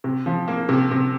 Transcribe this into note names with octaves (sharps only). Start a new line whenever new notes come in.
C3
F3
A#3
C3
C3